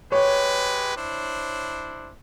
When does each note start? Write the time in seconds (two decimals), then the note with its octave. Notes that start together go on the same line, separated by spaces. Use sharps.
0.12 G#3 G4 B4 C#5
0.96 D4 E4 C5